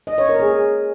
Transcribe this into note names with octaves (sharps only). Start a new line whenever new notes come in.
D#5
C#5
A#4
G#4